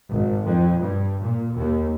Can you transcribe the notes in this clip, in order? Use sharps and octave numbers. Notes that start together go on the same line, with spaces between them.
G#1
F2
G2
A#2
D#2